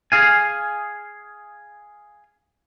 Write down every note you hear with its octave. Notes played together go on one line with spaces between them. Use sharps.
G#4 F5 G#5